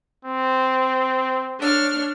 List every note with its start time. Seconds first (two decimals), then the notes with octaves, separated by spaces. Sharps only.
0.25 C4
1.59 D4 C#5 F6